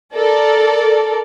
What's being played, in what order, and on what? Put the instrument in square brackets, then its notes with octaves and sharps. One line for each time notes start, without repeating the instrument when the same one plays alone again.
[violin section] A4 A#4 D5